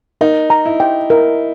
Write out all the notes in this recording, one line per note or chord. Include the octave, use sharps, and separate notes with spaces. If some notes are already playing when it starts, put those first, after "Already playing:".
D#4 A#4
A#5
E4
G5
E4 A#4